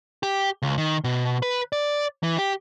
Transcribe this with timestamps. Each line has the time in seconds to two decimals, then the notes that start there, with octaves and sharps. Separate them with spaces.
0.23 G4
0.62 C#2
0.78 D#3
1.04 B2
1.42 B4
1.73 D5
2.23 E3
2.38 G4